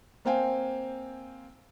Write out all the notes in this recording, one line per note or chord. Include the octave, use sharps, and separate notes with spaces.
A#3 C4 C5 F5 G5 G#5